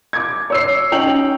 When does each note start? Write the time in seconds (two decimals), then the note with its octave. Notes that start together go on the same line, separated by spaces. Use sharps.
0.13 D6 G#6
0.50 C#5 E6 C7
0.92 C#4 D#4 G5 F7 F#7